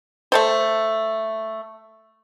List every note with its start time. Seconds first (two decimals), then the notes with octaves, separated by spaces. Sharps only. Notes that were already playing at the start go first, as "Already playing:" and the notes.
0.32 A3 A4 C5